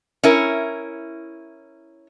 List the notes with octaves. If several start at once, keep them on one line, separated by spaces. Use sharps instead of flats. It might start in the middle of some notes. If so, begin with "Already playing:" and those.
C#4 E4 A#4